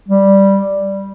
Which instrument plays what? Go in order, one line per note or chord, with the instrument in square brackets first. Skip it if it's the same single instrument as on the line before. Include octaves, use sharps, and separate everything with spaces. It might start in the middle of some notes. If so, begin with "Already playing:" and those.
[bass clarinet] G3